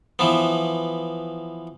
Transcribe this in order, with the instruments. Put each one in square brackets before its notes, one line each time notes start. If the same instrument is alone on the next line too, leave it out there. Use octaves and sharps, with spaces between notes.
[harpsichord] E3 F3 B3